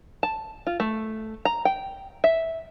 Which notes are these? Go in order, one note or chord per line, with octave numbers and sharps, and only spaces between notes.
A5
F4
A3
A#5
G5
E5